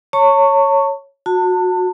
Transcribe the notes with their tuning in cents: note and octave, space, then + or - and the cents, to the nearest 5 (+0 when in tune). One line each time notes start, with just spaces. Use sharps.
C#5 -5 A5 +40 C#6 +0
F#4 -20 A5 +30